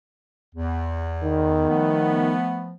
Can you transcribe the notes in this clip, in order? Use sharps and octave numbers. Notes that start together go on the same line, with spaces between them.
E2
D#3
F3 A3 B3